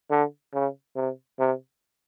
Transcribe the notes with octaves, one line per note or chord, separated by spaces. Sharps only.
D3
C#3
C3
C3